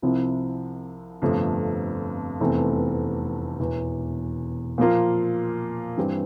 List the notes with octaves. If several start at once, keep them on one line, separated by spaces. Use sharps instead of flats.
C2 C3 F3 C4 E4
G1 F2 C3 F3 A3
F1 E2 E3 A3 C4
E1 E2 E3
A#2 F3 A#3 F4
G2 E3 G3 C4 G4